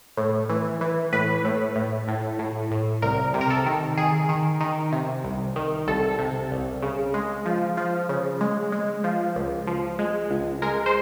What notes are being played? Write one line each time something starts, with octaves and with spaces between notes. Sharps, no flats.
A2
E3
E3
A2 B4
A2
A2
A2
A2
A2
C2 A#4
C3
A#4
A4
D#3
D#3 G#4
D#3
D#3
C3
C2
D#3
C2 A4
C3
C2
C#3
G#3
F3
F3
C#3
G#3
G#3
F3
C#2
F3
G#3
C#2
G#3 A#4
C5